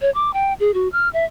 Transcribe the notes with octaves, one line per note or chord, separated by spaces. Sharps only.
C#5
D6
G5
G#4
F#4
F6
E5